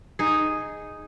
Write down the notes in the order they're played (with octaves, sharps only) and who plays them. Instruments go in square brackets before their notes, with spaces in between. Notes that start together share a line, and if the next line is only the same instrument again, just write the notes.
[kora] D#4 G#4